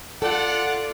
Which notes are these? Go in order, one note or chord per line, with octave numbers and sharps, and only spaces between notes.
F4 A4 D5 F#5